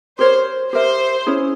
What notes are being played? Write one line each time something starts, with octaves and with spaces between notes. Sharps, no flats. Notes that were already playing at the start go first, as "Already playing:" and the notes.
G4 A#4 C5 C#5
G4 A#4 C5 E5
C#4 E4 G#4 C#5